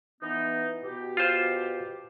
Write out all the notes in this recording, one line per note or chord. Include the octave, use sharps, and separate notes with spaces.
E3 B3 D#4
B2 G4
F4 C5